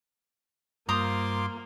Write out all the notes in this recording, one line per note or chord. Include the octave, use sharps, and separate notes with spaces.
G2 A#3 F4 C5 A#5 C6 D6 D#6